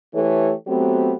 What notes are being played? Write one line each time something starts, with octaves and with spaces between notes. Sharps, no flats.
E3 A3 G4 A4 C#5
F#3 A3 B3 C4 G4